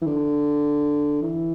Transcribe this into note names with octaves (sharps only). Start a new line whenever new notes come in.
E3
D3
E3